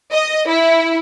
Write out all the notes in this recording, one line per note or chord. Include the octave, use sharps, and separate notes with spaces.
D#5
E4